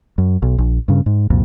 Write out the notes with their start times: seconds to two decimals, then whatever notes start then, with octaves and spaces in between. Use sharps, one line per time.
0.18 F#2
0.42 B1
0.58 A#1
0.88 G2 C#3
1.06 G#2
1.30 C2 F2 A#2